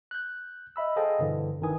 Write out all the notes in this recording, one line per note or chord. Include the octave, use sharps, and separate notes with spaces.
F#6 G6
D#5 E5 B5 E6
G#4 A4 C5 D#5 F5 G5
G2 B2 D3 E3
G1 D#3 E3 D4 G#5 D#6